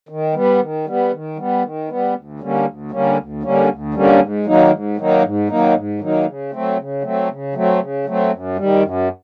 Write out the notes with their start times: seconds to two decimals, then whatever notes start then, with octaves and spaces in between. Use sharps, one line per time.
0.09 D#3
0.34 G3 B3
0.60 D#3
0.86 G3 B3
1.12 D#3
1.37 G3 B3
1.63 D#3
1.88 G3 B3
2.14 D2
2.40 D3 G3 A#3 C#4
2.65 D2
2.91 D3 G3 A#3 C#4
3.17 D2
3.43 D3 G3 A#3 C#4
3.69 D2
3.94 D3 G3 A#3 C#4
4.20 G#2
4.45 D#3 F#3 A#3 D#4
4.71 G#2
4.97 D#3 F#3 A#3 D#4
5.22 G#2
5.49 D#3 F#3 A#3 D#4
5.74 G#2
6.00 D#3 F#3 A#3 D#4
6.26 C#3
6.52 F#3 A3 C4
6.77 C#3
7.02 F#3 A3 C4
7.29 C#3
7.54 F#3 A3 C4
7.80 C#3
8.06 F#3 A3 C4
8.31 F#2
8.56 D#3 G3
8.83 F#2